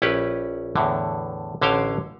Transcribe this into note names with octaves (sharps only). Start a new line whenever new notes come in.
A#1 C#4 E4 G4 B4
E2 A2 D3
A1 D3 C#4 C5 F5 G5